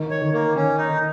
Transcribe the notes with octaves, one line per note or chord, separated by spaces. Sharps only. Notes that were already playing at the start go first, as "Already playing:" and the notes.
Already playing: D#3
C#5
D#3
A#3
D#3 C#4
D#4
D#3